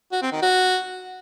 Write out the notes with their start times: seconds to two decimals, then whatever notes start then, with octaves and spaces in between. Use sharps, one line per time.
0.12 F#4
0.22 C4
0.32 D#3
0.42 F#4